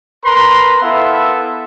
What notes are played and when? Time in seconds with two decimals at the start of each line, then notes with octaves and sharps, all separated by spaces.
0.25 A#4 B4 A#5 C6
0.82 B3 E4 A4 E5 F5